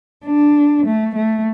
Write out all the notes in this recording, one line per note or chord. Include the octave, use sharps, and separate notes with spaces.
D4
A3
A3